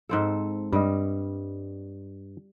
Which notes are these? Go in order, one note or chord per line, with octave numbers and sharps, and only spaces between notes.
G#2 C4 A4
G2 G3 D#5